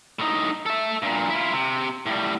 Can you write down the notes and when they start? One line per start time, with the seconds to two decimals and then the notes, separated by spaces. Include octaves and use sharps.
0.19 A2 D#4
0.66 A4 E5
1.02 G2 A#2
1.30 E4 F4
1.53 C3
2.06 A2 G3